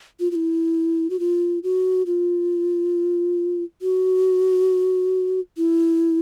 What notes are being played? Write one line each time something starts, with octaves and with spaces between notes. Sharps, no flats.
F4
F4
E4
F#4
F4
F#4
F4
F#4
E4